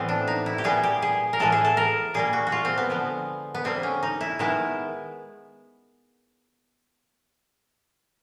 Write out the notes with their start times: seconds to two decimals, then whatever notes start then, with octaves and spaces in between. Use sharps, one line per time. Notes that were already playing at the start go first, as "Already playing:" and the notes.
Already playing: A2 E3 G3 B3 C4
0.09 D4
0.28 D#4
0.46 E4
0.58 G4
0.64 A#2 G3 B3 G#4
0.83 G4
1.02 G#4
1.33 A#4
1.39 A2 E3 G#3 B3 A4
1.52 G#4
1.65 A4
1.77 A#4
2.14 A#2 G3 A#3 G#4
2.33 F#4
2.47 F#4
2.52 F4
2.65 C4
2.78 B3
2.89 D3 F3 G#3 B3
3.55 B3
3.64 D3 G3 A#3 C4
3.83 C#4
4.03 D#4
4.21 E4
4.39 D#3 G#3 B3 E4